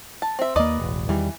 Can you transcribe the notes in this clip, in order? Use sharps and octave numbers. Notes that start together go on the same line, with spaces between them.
A5
C4 E5
D#2 A#3 B4 D5 D#5
E1 A1
E2 D#3 E3 G3